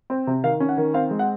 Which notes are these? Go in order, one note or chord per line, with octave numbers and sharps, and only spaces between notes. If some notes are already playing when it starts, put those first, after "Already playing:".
C4
C3
D#3 F5
C#4
F#5
D#3
C4 F5
G#3
F#5